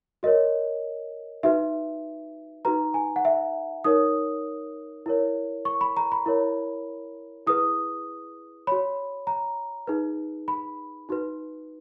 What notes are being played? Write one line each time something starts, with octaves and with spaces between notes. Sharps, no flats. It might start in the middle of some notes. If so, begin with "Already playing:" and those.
F#4 A#4 C#5 D#5
D#4 F#4 B4 E5
D#4 F#4 B4 A#5
G#5
F#5
E5
D#4 A#4 C#5 D#6
E4 A#4 C#5
C#6
B5
A#5
B5
E4 A#4 C#5
E4 G#4 B4 D#6
F#4 C#5 B5
A#5
D#4 G#4 B4
B5
D#4 F#4 B4